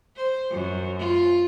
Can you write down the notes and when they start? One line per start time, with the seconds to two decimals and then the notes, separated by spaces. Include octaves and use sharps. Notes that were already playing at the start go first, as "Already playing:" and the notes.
0.16 C5
0.50 F#2
0.99 F4